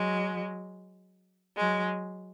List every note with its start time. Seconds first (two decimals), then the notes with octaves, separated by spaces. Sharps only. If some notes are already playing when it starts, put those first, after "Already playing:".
Already playing: F#3 G#3
1.58 F#3 G#3